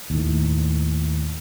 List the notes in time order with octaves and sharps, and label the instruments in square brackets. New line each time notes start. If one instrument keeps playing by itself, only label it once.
[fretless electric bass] D#2 A2